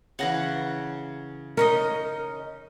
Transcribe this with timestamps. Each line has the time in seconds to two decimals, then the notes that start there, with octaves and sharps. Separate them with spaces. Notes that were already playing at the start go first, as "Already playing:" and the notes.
0.19 C#3 E3 F#5 A#5
1.57 C#4 D#4 A#4 D#5